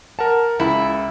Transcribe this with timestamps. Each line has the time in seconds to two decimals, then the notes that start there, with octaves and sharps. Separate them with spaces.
0.19 A#4 F#5 A5
0.60 C#2 E4